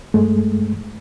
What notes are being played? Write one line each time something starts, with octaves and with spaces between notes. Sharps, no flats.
G2 G#3 A3